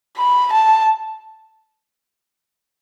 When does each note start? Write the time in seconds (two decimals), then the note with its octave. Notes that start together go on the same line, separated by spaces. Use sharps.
0.17 B5
0.53 A5